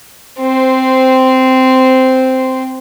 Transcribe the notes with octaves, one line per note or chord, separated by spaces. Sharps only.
C4 C5